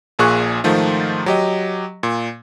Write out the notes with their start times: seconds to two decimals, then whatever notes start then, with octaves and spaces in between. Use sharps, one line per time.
0.19 A#1 A#2 G#4 C#6 F#6
0.64 G#2 D#3 F3 A3 F4
1.26 F#3 G4 D#5
2.03 A#2